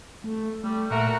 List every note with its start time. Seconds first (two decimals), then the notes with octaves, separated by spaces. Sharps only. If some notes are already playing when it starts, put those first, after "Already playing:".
0.24 A3
0.64 G3 A3
0.91 A#2 A3 F#4 A#4